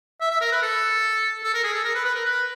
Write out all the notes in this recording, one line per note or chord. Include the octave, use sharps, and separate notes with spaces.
E5
E5
A#4
B4
A4
A4
A#4
G#4
A4
A#4
B4
B4
A#4
B4